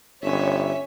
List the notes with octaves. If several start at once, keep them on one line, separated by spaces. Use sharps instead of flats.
G1 C#4 C#5 E5